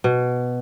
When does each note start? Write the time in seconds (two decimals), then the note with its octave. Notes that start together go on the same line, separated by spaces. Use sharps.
0.04 B2